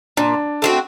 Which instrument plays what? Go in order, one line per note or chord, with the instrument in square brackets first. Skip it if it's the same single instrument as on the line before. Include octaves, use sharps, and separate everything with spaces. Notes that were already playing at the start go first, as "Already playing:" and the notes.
[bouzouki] A#2 [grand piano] D4
[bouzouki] A3 C4 F#4